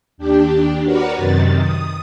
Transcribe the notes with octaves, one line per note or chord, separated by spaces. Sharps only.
D#2 D4 G4
F#4 A#4 B4 C#5 D5 F#5
F#2 C3 D#3 A6
D#6